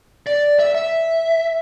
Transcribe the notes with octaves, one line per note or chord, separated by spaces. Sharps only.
D5
E5
E5